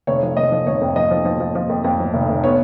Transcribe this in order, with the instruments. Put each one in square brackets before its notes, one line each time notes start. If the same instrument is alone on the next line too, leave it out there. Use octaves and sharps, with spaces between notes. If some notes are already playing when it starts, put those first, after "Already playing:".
[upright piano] F1 C#5
F3
F1 D#5
F3
F1 C#5
F2
F3 D#5
F3
F3
F3
F3
F2
F2
F3
F1
F1
B3 C#5